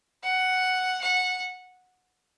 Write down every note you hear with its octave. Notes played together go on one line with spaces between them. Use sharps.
F#5
F#5